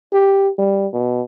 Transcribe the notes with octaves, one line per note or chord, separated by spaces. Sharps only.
G4
G3
B2